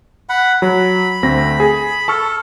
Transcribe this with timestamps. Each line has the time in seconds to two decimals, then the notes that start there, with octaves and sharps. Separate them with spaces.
0.29 F#5 B5
0.62 F#3 B5
1.23 D2 C4 A#6
1.60 G#4
2.08 A4 A5 C#6 F6